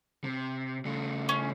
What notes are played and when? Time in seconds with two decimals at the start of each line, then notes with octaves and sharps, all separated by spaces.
0.24 C3
0.85 C#3 A3
1.29 C#4